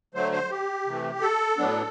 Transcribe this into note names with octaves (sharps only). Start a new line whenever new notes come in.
D3 F#3 A3 C5
C5
G4
C3 E3 A3
A4
A2 F#3 B3 D4